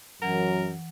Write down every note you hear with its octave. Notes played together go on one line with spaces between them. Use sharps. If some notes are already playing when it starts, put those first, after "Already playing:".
F#2 E3 F#3 A#4 F#5